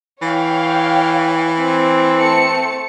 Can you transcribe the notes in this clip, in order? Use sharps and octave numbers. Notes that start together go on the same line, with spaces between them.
E3 C#5 F5 G5
C4
A3 A5 C#7